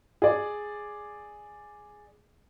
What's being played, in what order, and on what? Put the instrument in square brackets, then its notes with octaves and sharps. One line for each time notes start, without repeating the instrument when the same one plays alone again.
[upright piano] G#4 D5